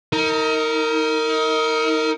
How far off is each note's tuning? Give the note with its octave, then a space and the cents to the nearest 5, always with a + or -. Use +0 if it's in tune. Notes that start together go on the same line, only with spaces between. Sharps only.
D#4 +30 A#4 -20